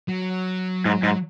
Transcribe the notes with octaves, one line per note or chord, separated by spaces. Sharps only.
F#3
G#2
G#2